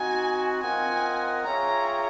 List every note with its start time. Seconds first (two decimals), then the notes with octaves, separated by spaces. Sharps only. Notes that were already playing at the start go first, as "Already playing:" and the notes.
Already playing: C4 D#4 F#4 G#5
0.62 C4 F4 A#4 D#5 F#5 G#5
1.45 F4 G#4 C#5 E5 G5 A#5